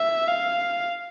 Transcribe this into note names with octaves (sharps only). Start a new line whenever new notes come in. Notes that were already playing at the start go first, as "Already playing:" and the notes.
Already playing: E5
F5